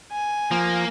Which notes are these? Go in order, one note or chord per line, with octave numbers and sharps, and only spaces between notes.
G#5
F3 A#3